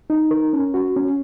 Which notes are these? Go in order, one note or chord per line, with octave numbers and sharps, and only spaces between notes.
D#4
A#4
C#4
F#4
C#4